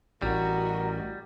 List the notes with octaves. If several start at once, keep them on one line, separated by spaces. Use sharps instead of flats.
A1 G3 F#4 A#4 D#5